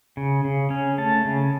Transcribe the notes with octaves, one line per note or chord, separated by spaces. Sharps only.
C#3
C#3
C#4
A3 A5
C#3